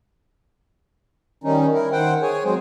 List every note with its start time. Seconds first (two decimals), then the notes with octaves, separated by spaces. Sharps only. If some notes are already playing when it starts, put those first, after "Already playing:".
1.44 D#3 G3 C#4 D#4
1.73 E4 A#4
1.92 D#3 C5 F#5 G5
2.22 G#4 C#5 G#5
2.44 F#3 G#3 C4 C5